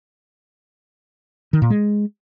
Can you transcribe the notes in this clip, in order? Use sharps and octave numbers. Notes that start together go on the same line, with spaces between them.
D#3
A#2
G#3